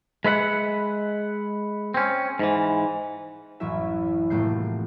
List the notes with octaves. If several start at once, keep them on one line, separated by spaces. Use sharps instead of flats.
G#3 B4 E5 F#5
C4 C#4
G#2 E3
A1 F#2 F#3 E4 E5
F1 A2 A3 A#3 G6 C7